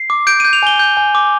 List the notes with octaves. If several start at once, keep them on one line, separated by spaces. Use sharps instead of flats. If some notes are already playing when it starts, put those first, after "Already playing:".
Already playing: C7
D6
G6 D7
G6 D#7
F7
G#5 G7
G6
G#5
D6